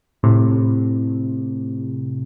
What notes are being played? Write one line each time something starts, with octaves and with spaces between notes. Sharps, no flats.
A2 C3